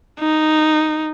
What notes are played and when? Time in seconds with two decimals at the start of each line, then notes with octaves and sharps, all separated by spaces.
0.19 D#4